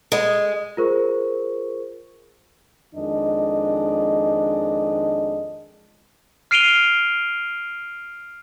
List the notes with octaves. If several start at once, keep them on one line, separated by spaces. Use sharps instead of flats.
G#3
F4 G#4 A#4 C5 C#6
F2 D#3 G#3 D4 D#5
F6 C7 D7 D#7 F7 G7